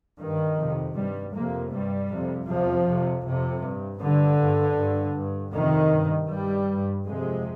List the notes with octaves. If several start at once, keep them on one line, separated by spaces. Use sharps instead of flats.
G2 D#3
F2 C3
G2 G3
F2 C3 A#3
G2 G3
F2 C3
F2 C3 F3
F2 C3
F2 C3
G2
G2 D3
G2
G2
G2
F2 C3 D#3
G2
G2 G3
G2
F2 C3 G#3